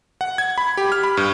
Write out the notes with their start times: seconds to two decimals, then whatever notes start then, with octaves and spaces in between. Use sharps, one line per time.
0.21 F#5
0.38 G#6
0.58 B5
0.77 G4
0.92 F6
1.04 B5
1.17 G2